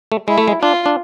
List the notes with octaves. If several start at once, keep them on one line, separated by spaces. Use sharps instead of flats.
A3
G#3 E4
A3
G#3
D4 F4
D4